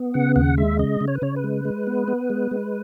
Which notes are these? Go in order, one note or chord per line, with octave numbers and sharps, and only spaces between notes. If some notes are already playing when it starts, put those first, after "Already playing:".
Already playing: B3
C#3 F#5
D#2 F#5
G#3 E5
C#3 D#5
C#3
C#5
B4
C#3 C#5
B4
G#3
G#3
B3
B3
G#3
G#3